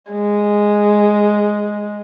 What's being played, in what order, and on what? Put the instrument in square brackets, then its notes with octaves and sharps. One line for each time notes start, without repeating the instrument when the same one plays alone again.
[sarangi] G#3